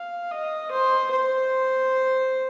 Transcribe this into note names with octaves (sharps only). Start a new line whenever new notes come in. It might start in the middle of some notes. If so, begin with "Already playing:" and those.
Already playing: F5
D#5
C5
C5